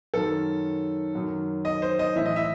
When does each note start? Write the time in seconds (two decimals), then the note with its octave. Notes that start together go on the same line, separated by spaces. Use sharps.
0.14 F#2 D#3 A4
1.15 F#2 D#3
1.65 D#5
1.82 C5
1.99 D#5
2.16 A2 E3 E5
2.26 D#5
2.36 E5